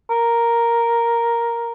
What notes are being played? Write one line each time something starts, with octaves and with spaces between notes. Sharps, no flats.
A#4